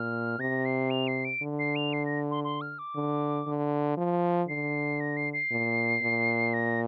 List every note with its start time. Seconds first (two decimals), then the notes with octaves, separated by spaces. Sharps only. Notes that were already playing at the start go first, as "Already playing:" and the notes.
Already playing: A#2 F6
0.39 C3 A#6
0.65 C7
0.91 F7
1.08 C7
1.25 D7
1.42 D3
1.59 C7
1.76 F7
1.93 C7
2.06 A#6
2.31 C6
2.44 C6
2.61 F6
2.79 D6
2.96 D3
3.47 D3
3.97 F3
4.49 D3 C7
5.00 A#6
5.17 C7
5.33 C7
5.51 A#2
6.02 A#2
6.54 A#6